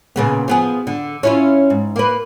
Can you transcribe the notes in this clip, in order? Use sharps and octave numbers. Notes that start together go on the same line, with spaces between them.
A#2 C#3 B3
F3 B3 G#4
D3
C#4 E4 F4
G#2
A#3 B4